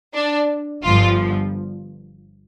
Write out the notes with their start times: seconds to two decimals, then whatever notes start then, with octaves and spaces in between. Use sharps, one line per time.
0.14 D4
0.83 G1 G2 F3 F4